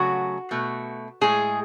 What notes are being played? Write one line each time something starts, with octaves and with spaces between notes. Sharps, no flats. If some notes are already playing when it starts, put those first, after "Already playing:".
Already playing: C#3 F#3 A3 F#4
B2 A3
A2 G#3 G#4